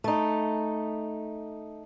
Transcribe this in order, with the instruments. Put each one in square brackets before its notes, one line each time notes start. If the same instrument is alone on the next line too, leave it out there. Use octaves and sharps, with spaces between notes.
[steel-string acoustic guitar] A3 D#4